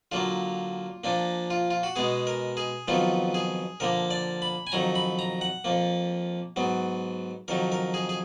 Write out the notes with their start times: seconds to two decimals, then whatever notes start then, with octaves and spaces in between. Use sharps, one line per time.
0.12 D3 F#3 A#3 F4
1.04 A#2 F3 A#3 D4
1.50 F4
1.71 F4
1.83 F#4
1.96 B2 G#3 B3 G#4
2.27 A#4
2.57 G#4
2.88 F2 D#3 F#3 B3 F4
3.34 G#4
3.80 D3 F3 A#3 A#4
4.10 D5
4.42 B5
4.67 G#5
4.72 F2 D#3 F#3 A#5
4.95 B5
5.19 A#5
5.41 F#5
5.64 F2 F3 A#3
6.56 G#2 F#3 B3
7.48 F2 D#3 F#3 A#4
7.72 A#4
7.94 G#4
8.09 G#4